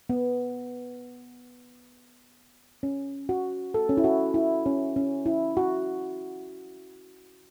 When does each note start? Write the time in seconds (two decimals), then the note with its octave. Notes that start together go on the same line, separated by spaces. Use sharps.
0.09 B3
2.83 C#4
3.29 F#4
3.74 A4
3.89 C#4
3.97 E4
4.04 F#4
4.34 E4
4.66 C#4
4.96 C#4
5.26 E4
5.57 F#4